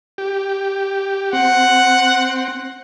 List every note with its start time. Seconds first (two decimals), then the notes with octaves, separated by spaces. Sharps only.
0.18 G4
1.33 C4 F#5